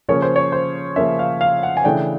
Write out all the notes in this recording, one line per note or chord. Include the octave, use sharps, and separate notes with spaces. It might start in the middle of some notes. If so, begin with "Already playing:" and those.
C#3 F3 A#3 C#4 C#5
C5
C#5
C5
C#3 F3 A#3 C#4 E5
F5
F5
F#5
G#5
C#3 E3 A3 D4 G5